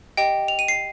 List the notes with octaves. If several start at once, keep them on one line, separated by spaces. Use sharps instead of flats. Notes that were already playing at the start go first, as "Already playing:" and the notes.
G4 D#5 G5
F7
D#7
C7